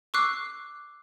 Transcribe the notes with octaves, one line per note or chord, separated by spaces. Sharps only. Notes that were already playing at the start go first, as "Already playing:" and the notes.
C#6 D6 E6 F#6 C7